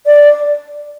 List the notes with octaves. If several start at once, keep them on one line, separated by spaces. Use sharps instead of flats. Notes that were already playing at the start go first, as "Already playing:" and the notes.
D5